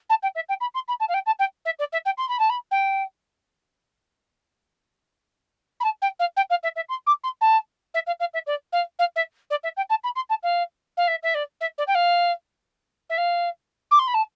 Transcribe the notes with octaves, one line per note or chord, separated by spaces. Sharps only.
A5
G5
E5
G5
B5
C6
B5
A5
F5
G5
A5
G5
E5
D5
E5
G5
C6
B5
A5
B5
G5
B5
A5
G5
F5
G5
F5
E5
E5
C6
D6
C6
A5
E5
F5
F5
E5
D5
F5
F5
E5
D5
E5
G5
A5
B5
C6
A5
F5
F5
E5
E5
D5
E5
D5
G5
F5
E5
F5
D6
C6
B5
A5